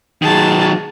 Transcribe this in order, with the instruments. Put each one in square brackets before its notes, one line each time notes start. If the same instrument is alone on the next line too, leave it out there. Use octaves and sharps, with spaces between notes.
[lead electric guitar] D#3 F#3 [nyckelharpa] G#4 A5